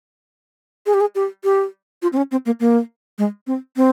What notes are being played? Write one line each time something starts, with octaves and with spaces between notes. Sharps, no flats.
G#4
G4
G#4
G4
G4
F4
C4
C#4
C4
A#3
A#3
G#3
C4
C4